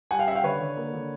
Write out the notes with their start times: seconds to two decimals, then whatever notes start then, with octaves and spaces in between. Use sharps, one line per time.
0.11 G3 F#5 G#5
0.19 F5 G5
0.27 C#4 E5 F#5
0.35 F5 G5
0.44 D3 B4 C#5
0.60 D3
0.77 A#3
0.93 D3